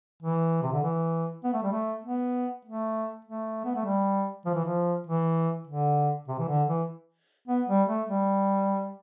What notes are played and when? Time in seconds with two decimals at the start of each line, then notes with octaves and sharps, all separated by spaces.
0.23 E3
0.63 C3
0.73 D3
0.83 E3
1.44 B3
1.54 A3
1.63 G3
1.72 A3
2.04 B3
2.65 A3
3.25 A3
3.65 B3
3.75 A3
3.85 G3
4.46 F3
4.55 E3
4.66 F3
5.07 E3
5.67 D3
6.28 C3
6.38 E3
6.48 D3
6.68 E3
7.48 B3
7.69 G3
7.89 A3
8.08 G3